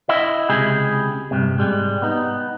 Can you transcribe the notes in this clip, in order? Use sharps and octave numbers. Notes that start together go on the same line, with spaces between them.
E4 D#5
C#2 C3 G4 G#4 B5
G2 C3
G#2 G3 G#3
B3 D#4